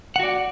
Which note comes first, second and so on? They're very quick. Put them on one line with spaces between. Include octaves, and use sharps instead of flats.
F#5 F#4 D5